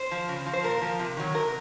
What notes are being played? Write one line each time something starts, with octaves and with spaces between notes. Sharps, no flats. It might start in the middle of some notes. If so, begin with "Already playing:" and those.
Already playing: C5
F3
C#3
F3
C5
A#2 A#4
F3
C3
D#3 F#3
C3 A#4